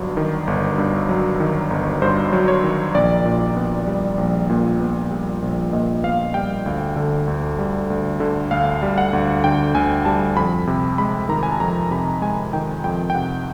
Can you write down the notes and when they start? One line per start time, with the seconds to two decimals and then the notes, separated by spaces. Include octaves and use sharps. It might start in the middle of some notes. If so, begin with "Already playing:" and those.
Already playing: G1 G2 F#3
0.17 D#3
0.47 G1
0.78 G2
1.09 F#3
1.40 D#3
1.71 G1
2.02 G2 C5
2.33 F#3
2.48 C#5
2.64 D#3
2.95 A#1 D5
3.25 A#2
3.57 B3
3.87 G3
4.18 A#1
4.49 A#2
4.80 B3
5.11 G3
5.42 A#1
5.72 A#2 D#5
6.03 B3 F5
6.34 G3 G5
6.66 D2
6.96 D3
7.28 D2
7.59 G3
7.90 D2
8.20 D3
8.51 D2 F5
8.82 G3
8.98 F#5
9.13 D2
9.44 D3 G5
9.75 D2 G#5
10.05 G3 A5
10.36 F2 B5
10.67 C3
10.98 G#3 B5
11.29 D#3 A#5
11.43 G#5
11.51 A5
11.60 F2 A#5
11.91 C3 B5
12.22 G#3 G#5
12.53 D#3 G5
12.84 F2 G5
13.10 G5
13.15 C3 F#5